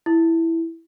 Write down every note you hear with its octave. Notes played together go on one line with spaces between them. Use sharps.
E4